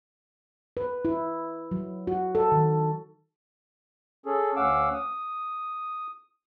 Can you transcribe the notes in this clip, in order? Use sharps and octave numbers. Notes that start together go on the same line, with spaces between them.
B4
E4
F#3
F#4
A4
D#3
C#4 G#4 A4
D2 C#4 F5 F#5 D6 E6
D#6